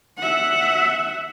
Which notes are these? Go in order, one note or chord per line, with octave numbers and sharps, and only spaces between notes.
E5 F#5